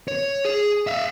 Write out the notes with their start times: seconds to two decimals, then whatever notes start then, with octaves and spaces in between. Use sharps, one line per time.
0.08 C#5
0.45 G#4
0.87 E5 F5